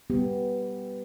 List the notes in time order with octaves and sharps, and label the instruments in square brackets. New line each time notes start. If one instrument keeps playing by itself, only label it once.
[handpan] G3 B3 G4